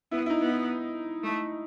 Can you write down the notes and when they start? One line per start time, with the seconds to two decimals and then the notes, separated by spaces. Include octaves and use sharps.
0.11 B3 E4
0.26 E4
0.30 D#4
0.40 B3
0.49 E4
1.24 A3